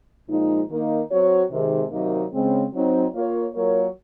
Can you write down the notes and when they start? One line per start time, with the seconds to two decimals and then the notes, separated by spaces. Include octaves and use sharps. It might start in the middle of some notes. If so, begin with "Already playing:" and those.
0.28 A#2 F3 G#3 D#4
0.69 D#3 A#3 D#4
1.10 F#3 C4 F#4 C#5
1.51 C3 D#3 G#3
1.91 C3 D#3 F#3 A#3 D#4
2.32 C#3 G#3 C4
2.73 F#3 C4 D#4
3.13 A#3 F4 A#4 C#5
3.54 F#3 A#3 F4 A#4 C#5